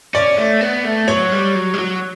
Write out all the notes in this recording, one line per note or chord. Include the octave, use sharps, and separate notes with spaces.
C#4 D5
A3
B3
A3
F#3 C#5
G3
F#3
G3
F#3